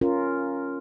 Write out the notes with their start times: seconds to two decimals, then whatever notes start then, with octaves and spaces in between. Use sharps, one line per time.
0.01 C#4 F4 A#4